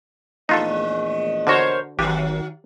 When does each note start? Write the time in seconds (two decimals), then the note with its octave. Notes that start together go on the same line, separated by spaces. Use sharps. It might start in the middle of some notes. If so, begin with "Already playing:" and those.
0.49 A#1 E2 A3 D#4 F4 A4 D#5
1.47 D3 F#4 A#4 C5 C#5
1.99 G#1 D#3 F#3 G4